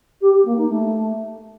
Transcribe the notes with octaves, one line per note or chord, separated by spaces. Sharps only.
G4
G4
A#3
D#4
A3